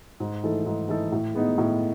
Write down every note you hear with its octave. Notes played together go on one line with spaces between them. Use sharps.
G#2
E3 A3 D#4 A4
G#2
E3 A3 D#4 A4
A2
G#3 B3 D#4
A2